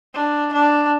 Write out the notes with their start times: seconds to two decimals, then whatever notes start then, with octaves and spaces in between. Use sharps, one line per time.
0.14 D4
0.53 D4